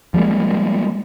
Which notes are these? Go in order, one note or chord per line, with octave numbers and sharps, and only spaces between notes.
F3 G3 G#3 A#3